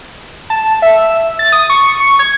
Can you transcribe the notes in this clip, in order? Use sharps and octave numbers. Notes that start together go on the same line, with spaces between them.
A5
E5
A6
D#6
C#6
C#6
G#6